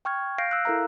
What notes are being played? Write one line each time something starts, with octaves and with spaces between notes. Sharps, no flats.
G5 C#6 F6 G#6
F5 F6 G6 A#6 C7 D7
E6 F#6
E4 A4 A#4 F5 A#5